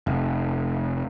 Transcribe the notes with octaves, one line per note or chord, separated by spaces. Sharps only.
F1